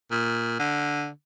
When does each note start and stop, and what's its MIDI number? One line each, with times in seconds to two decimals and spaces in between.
0.11 0.57 46
0.59 1.09 50